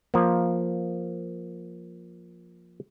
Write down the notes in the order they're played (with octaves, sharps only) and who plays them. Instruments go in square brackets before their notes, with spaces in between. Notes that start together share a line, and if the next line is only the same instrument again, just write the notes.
[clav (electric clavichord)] F3 A#3